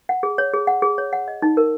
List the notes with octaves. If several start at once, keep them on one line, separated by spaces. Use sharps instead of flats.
F#5
G#4
C#5
G#4
F#5
G#4
C#5
F#5
D#5
D#4
A#4